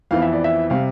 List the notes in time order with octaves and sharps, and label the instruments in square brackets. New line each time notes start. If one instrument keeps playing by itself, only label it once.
[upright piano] F2 E3 B3 F5
E5
D5
E5
C3 G3 F5